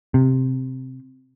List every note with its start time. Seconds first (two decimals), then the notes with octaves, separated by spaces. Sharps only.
0.14 C3